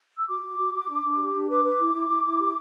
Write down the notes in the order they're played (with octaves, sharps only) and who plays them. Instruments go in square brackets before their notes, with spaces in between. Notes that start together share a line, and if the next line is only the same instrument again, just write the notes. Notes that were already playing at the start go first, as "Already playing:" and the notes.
[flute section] E6
F#4 D6
F#4
F#4
F#4
D4
D4
G4
D4
B4 D6
B4
E4
E4
E4
E4
G4